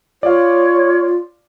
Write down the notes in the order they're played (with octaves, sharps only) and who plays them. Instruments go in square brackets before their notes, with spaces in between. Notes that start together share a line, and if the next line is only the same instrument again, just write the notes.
[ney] F4 [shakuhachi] C#5 [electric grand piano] D5 F5